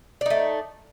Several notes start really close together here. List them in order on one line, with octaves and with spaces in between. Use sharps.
D5 D#4 A3